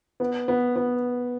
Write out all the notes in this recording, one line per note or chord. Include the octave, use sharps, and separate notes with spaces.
B3
B3
B3